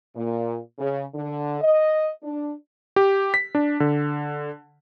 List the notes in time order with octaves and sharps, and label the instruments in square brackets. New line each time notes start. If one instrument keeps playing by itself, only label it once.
[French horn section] A#2
C#3
D3
D#5
D4
[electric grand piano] G4
B6
D4
D3